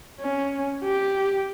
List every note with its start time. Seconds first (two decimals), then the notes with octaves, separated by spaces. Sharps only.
0.20 C#4
0.83 G4